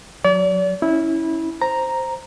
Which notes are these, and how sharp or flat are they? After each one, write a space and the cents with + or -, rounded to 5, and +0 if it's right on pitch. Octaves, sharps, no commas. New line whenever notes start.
F#3 -20 D5 -40
C#4 +0 E4 -20
C5 +0 A#5 +0